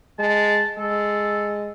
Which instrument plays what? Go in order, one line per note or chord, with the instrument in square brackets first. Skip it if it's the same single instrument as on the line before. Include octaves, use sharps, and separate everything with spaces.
[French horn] G#3 [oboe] A5
[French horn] G#3 [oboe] A4